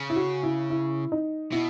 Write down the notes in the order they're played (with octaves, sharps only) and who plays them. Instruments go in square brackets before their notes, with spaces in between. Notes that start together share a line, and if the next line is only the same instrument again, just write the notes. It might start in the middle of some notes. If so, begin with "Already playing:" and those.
Already playing: [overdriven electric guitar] C#3
[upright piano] E4
F#4
E4
E4
D#4
[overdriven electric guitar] B2 [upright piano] E4